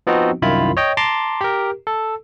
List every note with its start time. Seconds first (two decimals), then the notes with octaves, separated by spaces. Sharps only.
0.07 F3 B3 C4 D#4 F#4
0.42 C2 F#2 D#3 E4 F4 B5
0.77 C#5 D#5 G5
0.97 A5 A#5 C6 D6
1.41 G4 A#4
1.87 A4